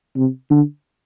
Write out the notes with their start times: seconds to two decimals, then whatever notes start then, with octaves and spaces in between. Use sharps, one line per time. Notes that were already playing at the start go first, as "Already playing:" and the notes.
0.16 C3
0.50 D3